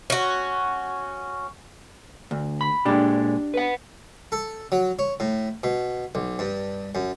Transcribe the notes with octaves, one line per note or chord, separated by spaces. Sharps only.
C#4 F#4
D2
B5
A#2 G#3 D4 G4
B4 F#5
A4
F#3
C#5
A2
B2
B1
G2
F#2